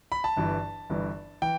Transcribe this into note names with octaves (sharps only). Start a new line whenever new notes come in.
B5
A5
G1 G2 E3
G1 G2 E3
E3 G5